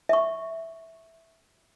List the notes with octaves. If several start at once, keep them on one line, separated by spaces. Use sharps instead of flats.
E5 C#6